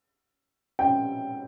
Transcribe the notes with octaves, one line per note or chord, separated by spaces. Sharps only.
G5